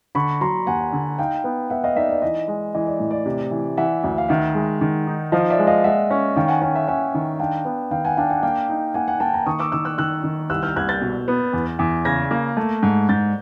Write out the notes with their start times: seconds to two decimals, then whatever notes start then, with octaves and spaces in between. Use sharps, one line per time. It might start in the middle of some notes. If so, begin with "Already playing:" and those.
0.15 D3 B5 C#6
0.41 F#3 A#5 C6
0.67 D#2 F#5 G#5
0.93 D3
1.18 D#4 F5 G5
1.44 B3
1.70 B3 E5 F#5
1.84 D#5 F5
1.96 D#4 D5 E5
2.09 D5
2.22 E3 D#5
2.48 G#3
2.74 E3 D#5
2.87 D5
3.00 A2
3.11 D5
3.25 C3
3.51 E3
3.77 E3 E5 F#5
4.04 D2
4.18 F5
4.29 D#3 E5 F#5
4.55 G#3
4.81 D#3
5.07 D#4
5.32 F3 D#5 F5
5.50 D5 E5
5.59 G#3
5.67 D#5 F5
5.84 G#3 E5 F#5
6.10 C#4
6.36 D#3 F5 G5
6.48 F#5 G#5
6.61 C#4 F#5 G#5
6.74 E5 F#5
6.87 C#4 E5 F#5
7.14 D#3
7.40 D4 F5 G5
7.65 B3
7.91 D#3 F5 G5
8.05 F#5 G#5
8.17 D4 F5 G5
8.30 F#5 G#5
8.43 A#3 F5 G5
8.69 D#4
8.94 A#3 F#5 G#5
9.08 F#5 G#5
9.20 A#3 G5 A5
9.34 G#5 A#5
9.46 D#3 C#6 D#6
9.60 D6 E6
9.72 D#3 D6 E6
9.85 E6 F#6
9.98 D#3 E6 F#6
10.24 D#3
10.50 C2 E6 F#6
10.63 F6 G6
10.76 C2 F#6 G#6
10.89 G6 A6
11.01 B2
11.28 B3
11.53 E2
11.79 E2
12.05 C#3 G#6 A#6
12.31 A#3
12.57 A3
12.83 G#2
13.09 G#2 G6 A6